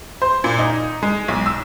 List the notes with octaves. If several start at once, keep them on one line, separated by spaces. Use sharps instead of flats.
C5
A#2
D#4
G#3
B1
E6